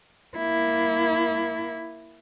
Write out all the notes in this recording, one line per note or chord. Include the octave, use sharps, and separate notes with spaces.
A#3 E4